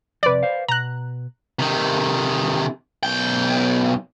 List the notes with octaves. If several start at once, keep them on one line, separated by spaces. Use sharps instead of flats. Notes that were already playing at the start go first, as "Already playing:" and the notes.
F2 C3 B4 D5
C5 F5
B2 A#5 F#6
C3 D#3
B1 G5